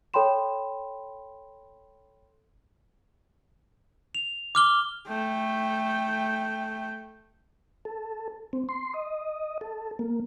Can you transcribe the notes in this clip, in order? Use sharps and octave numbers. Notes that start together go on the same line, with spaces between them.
A4 C#5 G5 B5 C6 E7
F7
D6 F6 G7
A3 G5
A4
C4
C6
D#5
A4
A#3